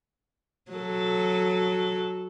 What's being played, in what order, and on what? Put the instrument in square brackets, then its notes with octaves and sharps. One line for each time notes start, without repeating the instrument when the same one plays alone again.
[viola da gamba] F#3 A4